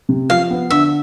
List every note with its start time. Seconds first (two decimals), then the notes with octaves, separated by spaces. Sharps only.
0.09 C3
0.30 F3 F5
0.50 B3
0.70 D3 E5